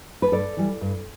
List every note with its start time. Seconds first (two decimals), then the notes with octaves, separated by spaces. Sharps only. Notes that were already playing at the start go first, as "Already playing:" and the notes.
0.22 B4
0.32 G2 A4 D5
0.57 E3 G3
0.81 G2